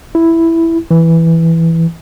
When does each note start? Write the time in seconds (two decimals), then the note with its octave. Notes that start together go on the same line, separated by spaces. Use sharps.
0.15 E4
0.91 E3